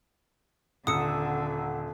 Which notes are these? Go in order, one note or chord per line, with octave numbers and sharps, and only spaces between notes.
D#1 D3 F#5 A#5 D#6 E6 C#7